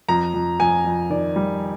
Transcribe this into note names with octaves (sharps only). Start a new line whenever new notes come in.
F2 A#5
F2
F2 G#5
F2
D#3 D5
G3